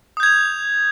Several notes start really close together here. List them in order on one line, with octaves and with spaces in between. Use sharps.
D#6 G6 G#6 F7